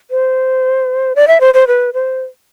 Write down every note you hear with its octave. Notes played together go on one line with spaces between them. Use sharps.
C5
D5
E5
C5
C5
B4
C5